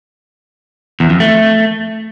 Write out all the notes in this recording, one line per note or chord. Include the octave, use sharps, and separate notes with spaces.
E2
F2
A3